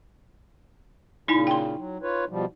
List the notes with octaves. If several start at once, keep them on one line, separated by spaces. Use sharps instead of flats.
A#2 C#3 D#4 E4 G#5
G5 C6
F#3
F4 B4 C#5
B2 F3 G3